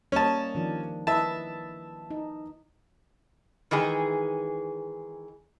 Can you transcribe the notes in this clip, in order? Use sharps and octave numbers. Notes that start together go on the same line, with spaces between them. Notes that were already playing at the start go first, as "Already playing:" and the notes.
G3 A#3 C#4 D#5 A5
D#3 F3 D4
E4 B4 D#5 E5 A5
D#4
D#3 E3 G#3 G#4